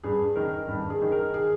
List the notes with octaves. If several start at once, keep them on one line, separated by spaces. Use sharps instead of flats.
G2 G#4
D#3 A#4
G2
G#4
D#3
A#4
G#4